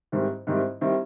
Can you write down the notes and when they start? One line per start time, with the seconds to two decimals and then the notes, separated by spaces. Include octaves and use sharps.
0.12 G#2 D#3 G3 C4 E4
0.47 G#2 D#3 G3 C4 E4
0.81 D#3 G3 C4 E4